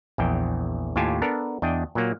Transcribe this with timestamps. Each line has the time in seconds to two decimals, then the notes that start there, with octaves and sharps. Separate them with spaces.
0.18 A#1 E2 G5
0.96 D#2 A2 F4 G4 G#5 A5
1.22 B3 D4 A4 A#4
1.62 E2 D4 D#5 G5
1.95 A#2 F#3 A#3